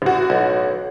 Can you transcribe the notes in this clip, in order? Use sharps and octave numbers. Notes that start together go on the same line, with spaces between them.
A1 F#4
B1